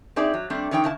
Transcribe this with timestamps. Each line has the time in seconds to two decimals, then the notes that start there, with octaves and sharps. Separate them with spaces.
0.16 C4 D#4 G#4 D5 E5
0.34 F#3
0.50 G3 A3 C4 D4
0.71 D3 E3 D#4 C#5 G5
0.84 C#3 E4 A5